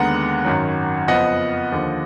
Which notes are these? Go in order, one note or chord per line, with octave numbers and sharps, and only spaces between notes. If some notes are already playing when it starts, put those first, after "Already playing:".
Already playing: D#2 D3 G#3 B3 F#5 A#5
G#1 F#2 D#3 F#3
F#1 F2 F3 B3 D#5 F#5
D#2 D3 F3